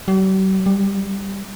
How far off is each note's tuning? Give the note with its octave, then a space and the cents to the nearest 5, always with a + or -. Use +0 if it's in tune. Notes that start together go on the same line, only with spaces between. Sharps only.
G3 -45
G3 +10